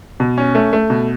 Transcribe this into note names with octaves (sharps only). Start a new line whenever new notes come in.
B2
C#4
A3
A3
B2